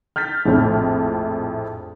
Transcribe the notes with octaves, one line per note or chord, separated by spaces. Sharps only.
F6 G6 A6 B6
A#1 F2 A2